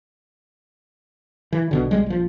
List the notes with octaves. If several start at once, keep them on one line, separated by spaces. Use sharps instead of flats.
E3
B1 B2 D3
B1 G3 G#3
A#1 F3